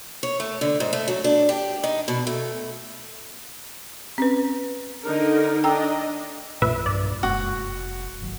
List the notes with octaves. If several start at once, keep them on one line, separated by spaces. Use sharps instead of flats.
C#5
A3
D3
G#2
A3
F#3
D4
G4
D#4
B2
A3
C4 C#4 B4
D3 D#4 A#4
D4 D#5 G5 A#5 E6
B1 F#2 A#2 E3 B4 E5
G2 D5
F1 F#2 G#3 A#3 F#4
G#1 F#3